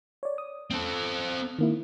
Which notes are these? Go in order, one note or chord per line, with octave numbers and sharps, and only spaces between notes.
C#5 D5
D#6
C4 A4
D#3 A#3 E4